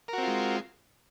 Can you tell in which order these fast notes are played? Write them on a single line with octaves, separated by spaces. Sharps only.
A#4 F#4 C4 F4 G#3